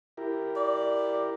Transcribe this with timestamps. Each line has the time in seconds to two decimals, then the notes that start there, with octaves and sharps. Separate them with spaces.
0.17 E4 G4 A#4
0.56 D5